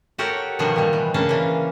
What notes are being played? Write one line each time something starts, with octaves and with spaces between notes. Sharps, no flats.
F#4 G4 A4 A#4 C#5 F#5
B2 D#3 F3 G3 D4 F#4
A#2 G3
E3
C#3 A#3 C#4 D4 A5
E3 A#3